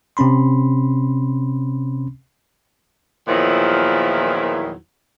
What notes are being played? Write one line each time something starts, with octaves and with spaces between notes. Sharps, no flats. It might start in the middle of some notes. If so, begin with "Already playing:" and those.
C3 C4 C#4 B5 C6
E2 A#2 D#3 F3 F#3 E4